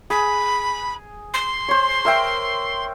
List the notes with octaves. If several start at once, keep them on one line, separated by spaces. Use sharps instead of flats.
G#4 B5
C6
C5 C#5
A#4 E5 G5